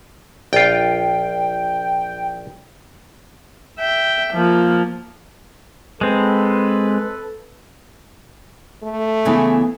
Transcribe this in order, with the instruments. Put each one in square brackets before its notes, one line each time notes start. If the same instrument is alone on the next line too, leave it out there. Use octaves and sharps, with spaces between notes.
[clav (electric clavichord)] A#1 F4 [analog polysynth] G5
[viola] E5 G5
F3 A#3
[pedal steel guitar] G#3 C4 [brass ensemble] A4 B4
[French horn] A3
[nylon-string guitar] C#3 E3 B3